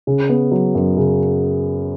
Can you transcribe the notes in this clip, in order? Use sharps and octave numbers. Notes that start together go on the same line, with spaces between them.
C#3
B3
F#3
F#2
C#3